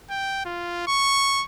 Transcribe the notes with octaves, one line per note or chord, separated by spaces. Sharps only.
G5
F4
C#6